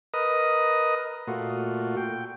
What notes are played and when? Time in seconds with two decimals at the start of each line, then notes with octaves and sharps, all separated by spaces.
0.14 A#4 B4 D#5 D#6
1.28 A#2 A3 F4 F#4
1.97 G5